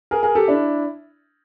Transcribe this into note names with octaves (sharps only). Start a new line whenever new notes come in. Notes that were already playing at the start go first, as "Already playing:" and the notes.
G#4 A#4
G#4 A#4
G4 A4
D4 E4